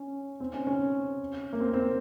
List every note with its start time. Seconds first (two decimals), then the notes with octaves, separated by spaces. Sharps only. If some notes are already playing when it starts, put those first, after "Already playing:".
Already playing: C#4
0.40 C4
0.54 C#4
0.67 C#4
1.53 A#3
1.60 C4
1.74 C4